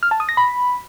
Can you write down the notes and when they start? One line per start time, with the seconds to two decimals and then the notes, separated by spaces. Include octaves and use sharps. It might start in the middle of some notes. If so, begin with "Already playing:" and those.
0.03 F6
0.11 A5
0.20 D#6
0.29 A#6
0.37 B5